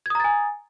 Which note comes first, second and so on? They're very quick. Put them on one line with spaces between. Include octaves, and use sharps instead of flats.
G#6 D#6 A#5 A6 G#5